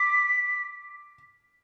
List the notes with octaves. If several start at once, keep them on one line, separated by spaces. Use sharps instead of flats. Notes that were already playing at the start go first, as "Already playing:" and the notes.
Already playing: D6 B6